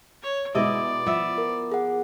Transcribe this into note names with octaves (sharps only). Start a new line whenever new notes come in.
C#5
B2 G#3 E4 D5 D#5 D#6
F3 B3 E5
A#4
G#4 F#5